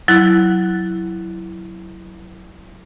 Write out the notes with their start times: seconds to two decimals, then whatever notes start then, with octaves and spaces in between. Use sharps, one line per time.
0.08 F#3 E4 F#6